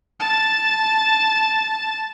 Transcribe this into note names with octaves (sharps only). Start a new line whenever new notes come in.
A5 A6